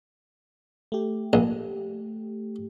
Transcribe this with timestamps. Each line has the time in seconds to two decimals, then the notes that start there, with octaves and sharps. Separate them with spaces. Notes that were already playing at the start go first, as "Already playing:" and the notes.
0.92 A3 G4
1.33 A#1